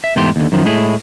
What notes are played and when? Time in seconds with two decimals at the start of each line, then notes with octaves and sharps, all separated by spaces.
0.04 E5
0.16 E2 G#2 A3 G4 C6
0.36 D#2 D3
0.52 F#2 D#3 F3
0.65 A2 G#3 E4 G#4